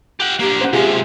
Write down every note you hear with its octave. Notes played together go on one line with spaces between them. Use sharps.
G4 F#5
A#3 D4 G4
C#4 C5 F#5
C3 G#3 F4 G4 G#4